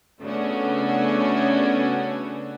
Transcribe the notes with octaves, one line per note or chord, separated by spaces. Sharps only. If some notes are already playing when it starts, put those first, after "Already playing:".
C#3 A3 B3 C#4 D4 F#4